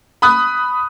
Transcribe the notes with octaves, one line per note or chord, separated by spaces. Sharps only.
B5 D#6 F#6